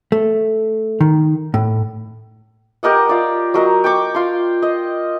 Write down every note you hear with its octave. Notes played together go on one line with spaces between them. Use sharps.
A3
D#3
A2
G4 A#4 D#5 F#5
F4 D5
F#3 A#4 D#5
G5 C#6 D6
F4 C6
D#5